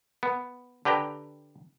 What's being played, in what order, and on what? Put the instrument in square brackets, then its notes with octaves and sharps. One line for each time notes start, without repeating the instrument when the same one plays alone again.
[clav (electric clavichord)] B3
D3 G4 B4 G5 A#5